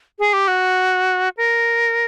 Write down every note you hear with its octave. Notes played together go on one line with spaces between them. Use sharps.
G#4
G4
F#4
A#4